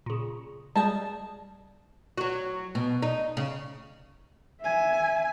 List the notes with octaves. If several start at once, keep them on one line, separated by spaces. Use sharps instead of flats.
A#2 C#3
G3 G#3 G#4 A5
F#3 F#4
B2
D#4
C#3
E5 G#5